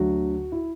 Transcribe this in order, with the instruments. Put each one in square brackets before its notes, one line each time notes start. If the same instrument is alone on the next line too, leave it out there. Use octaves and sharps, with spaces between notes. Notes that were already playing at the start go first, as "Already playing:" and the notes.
Already playing: [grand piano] D2 D3 F#3 F#4
E4